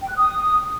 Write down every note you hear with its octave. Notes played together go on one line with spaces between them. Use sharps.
G5
F#6
D#6